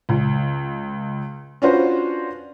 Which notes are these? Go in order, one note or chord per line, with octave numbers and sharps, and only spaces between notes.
C#2
C#4 D4 F4 F#4 B4 C5